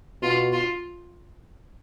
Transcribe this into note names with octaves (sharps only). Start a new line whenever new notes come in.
B2 F4
F4